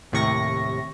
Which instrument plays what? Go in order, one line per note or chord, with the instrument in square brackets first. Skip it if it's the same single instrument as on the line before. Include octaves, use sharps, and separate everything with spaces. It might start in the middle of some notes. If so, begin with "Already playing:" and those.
[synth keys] D#2 A2 C3 C#6 A#6